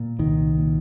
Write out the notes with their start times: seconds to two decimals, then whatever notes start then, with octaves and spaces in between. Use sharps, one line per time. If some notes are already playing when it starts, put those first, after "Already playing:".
Already playing: A#2
0.19 C2 D#3
0.57 A#2